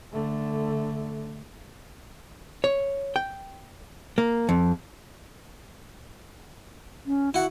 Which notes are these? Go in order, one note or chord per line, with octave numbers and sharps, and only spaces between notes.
D3 A3
C#5
G5
A#3
F2
C#4
E4 F#4 F#5